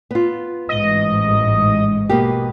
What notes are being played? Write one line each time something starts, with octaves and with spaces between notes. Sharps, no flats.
B3 F4
A1 G#2 D#5
B2 A#3 G4